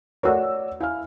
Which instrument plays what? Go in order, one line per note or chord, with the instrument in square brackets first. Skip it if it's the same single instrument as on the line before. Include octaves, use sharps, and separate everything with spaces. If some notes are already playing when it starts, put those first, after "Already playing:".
[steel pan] A3 F#4 A#4 [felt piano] C#5 D5 E6
[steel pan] E4 [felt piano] F5 G#5 F6